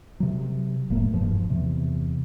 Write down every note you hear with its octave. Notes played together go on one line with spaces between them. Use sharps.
C3 F#3
F1 A2 A3 A#3
E1 G2 F3
E2 C3